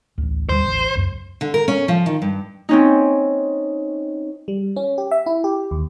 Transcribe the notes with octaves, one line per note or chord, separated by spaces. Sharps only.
A1 D2
D#2 D3 G3 C5
A1
C#2 F#2
D3
A#4
C#4
F3
D#3
G2
C4 C#4 D#4
G3
C#4
G4
E5
E4
G4
D#2